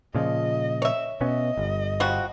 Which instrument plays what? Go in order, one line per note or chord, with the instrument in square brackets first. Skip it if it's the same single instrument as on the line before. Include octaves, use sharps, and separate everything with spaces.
[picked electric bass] A#2 C#3 F3 [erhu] D#5
[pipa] C#5 E5
[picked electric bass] B2 B3 C#4 [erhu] D#5
[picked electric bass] G1
[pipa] F3 G3 F#4